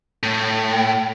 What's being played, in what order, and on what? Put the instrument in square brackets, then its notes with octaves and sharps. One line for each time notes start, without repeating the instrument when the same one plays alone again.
[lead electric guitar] A2